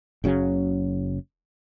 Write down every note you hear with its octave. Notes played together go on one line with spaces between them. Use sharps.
F#1 C#3 F#3 C#4